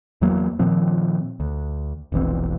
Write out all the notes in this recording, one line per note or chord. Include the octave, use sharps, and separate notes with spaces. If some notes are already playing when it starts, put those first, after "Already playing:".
E2 E3 F#3 A#3
A#2 D#3 F3 C4
D2
E1 A#1 E3 C4